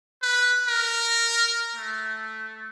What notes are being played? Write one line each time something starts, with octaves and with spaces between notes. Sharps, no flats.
B4
A#4
A3